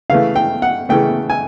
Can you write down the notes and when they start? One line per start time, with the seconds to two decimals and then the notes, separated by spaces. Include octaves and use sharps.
0.10 C#3 E3 A3 F5
0.36 G5
0.62 F#5
0.89 C#3 E3 A3 G5
1.30 G#5